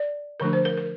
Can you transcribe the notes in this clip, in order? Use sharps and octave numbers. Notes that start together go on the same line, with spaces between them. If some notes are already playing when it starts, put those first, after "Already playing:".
Already playing: D5
D3 F3 A3 D4 A#4
C5
A#4
A#4